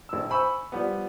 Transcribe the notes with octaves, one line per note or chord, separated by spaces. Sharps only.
A#1 E6
C5 G#5 B5 C#6 E6
F3 G3 B3